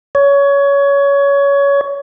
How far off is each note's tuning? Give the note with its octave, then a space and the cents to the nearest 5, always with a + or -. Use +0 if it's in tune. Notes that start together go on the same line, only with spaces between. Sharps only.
C#5 +20